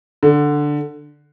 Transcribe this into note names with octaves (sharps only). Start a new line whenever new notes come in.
D3